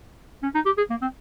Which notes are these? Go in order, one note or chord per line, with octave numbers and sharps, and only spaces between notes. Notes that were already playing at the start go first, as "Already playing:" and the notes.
C#4
D#4
G4
G#4
A#3
C4